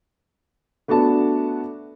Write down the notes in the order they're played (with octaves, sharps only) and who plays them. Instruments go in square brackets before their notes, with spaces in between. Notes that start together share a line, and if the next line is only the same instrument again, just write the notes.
[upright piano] A3 B3 D4 F#4 A5